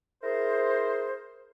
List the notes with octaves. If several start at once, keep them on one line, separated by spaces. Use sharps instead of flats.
E4 G#4 A#4 C5